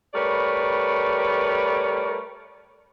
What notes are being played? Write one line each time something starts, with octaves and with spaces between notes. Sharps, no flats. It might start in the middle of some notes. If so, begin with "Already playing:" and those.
G3 A3 A#4 B4 C#5 D5